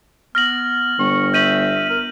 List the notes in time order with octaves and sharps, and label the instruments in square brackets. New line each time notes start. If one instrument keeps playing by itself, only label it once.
[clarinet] B3 [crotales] F6 A#6 F#7
[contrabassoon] G1 [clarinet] C#6
[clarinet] E5 [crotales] G6 D#7 F#7
[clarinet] A#4